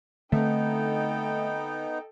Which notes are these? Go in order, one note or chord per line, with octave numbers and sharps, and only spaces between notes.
D3 A3 B3 C4 D#4 A4 G5